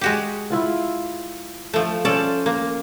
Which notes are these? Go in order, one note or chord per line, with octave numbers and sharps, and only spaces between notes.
G#3 F#4 G4
E4 F4 F#5
F3 A3
C#4 A4 C5 D5
A#3